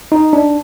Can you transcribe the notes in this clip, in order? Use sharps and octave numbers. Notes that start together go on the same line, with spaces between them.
D#4
D4